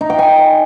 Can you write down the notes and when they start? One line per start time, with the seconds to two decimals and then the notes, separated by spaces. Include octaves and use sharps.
0.01 D#4
0.10 G5
0.19 G#5